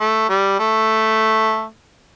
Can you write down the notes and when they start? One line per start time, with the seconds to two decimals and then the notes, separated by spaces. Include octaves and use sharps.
0.01 A3
0.30 G3
0.60 A3